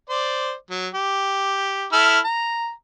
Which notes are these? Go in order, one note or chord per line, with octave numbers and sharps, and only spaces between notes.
C5 D5
F#3
G4
E4 A4 F6
A#5